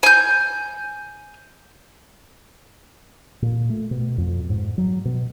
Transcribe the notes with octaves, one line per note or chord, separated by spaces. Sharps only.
G#5 G6
A#2
A3
B2
F2
G#2
F#3
B2